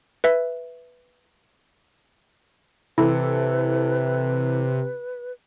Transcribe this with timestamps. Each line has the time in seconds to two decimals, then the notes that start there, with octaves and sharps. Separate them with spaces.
0.24 B4 E5
2.98 C3 E3 E4 A4 B4